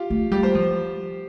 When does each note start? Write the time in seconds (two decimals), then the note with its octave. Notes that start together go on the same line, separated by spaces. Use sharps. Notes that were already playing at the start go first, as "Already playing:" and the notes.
Already playing: F4 G4
0.10 A3
0.31 G3 G4
0.43 C5
0.55 F3